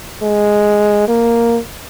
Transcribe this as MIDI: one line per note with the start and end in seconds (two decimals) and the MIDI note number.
0.23 1.08 56
1.08 1.59 58